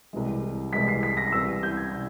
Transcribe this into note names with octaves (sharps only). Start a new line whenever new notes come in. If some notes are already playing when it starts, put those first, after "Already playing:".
C2 C3 E3 G#3
C2 C3 E3 G#3 B6
C7
B6
A#6
C2 C3 E3 E6
G6
G#6
C3